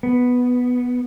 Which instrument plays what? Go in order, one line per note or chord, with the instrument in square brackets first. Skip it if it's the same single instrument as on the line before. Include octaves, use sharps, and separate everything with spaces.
[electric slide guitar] B3